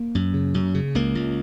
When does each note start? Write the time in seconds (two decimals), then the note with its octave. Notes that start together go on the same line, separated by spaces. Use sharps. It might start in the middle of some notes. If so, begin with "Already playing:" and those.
Already playing: A#3
0.15 F#2
0.34 C#3
0.54 F#2
0.74 C#3
0.95 C#2 A#3
1.15 C#2